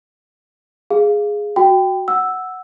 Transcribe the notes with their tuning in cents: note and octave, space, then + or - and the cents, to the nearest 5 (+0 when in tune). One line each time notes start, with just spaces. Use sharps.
G#4 +0 F5 -10
F#4 +0 G5 +0 B5 +45
F#5 +0 E6 +0